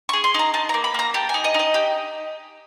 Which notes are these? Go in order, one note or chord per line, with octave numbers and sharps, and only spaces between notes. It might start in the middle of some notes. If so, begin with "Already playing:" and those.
G#4 C#6
C6
D#4 A#5
D#4 A5
A#3 A#5
B5
A#3 A#5
G4 A5
D#4 G#5
D#5
D#4 D#5
G4